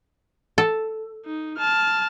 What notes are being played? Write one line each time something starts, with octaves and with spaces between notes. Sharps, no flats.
A4
D#4
A5 F6